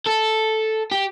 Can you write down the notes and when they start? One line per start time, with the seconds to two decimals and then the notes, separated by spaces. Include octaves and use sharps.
0.07 A4
0.91 G4